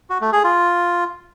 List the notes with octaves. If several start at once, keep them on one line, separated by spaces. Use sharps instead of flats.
F#4
A3
G#4
F4